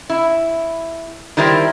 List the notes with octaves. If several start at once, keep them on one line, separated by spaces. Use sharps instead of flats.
E4
D#3 G3 E4 A#4 C5